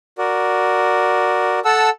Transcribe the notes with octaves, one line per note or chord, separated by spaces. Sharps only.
F#4 A#4 D5
A4 F#5 A5 E6